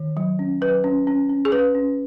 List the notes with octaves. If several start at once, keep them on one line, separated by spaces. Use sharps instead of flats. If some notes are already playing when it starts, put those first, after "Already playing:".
Already playing: D#3
F#3
C#4
F#3 B4
C#4
C#4
C#4
G#4
C#4 B4
C#4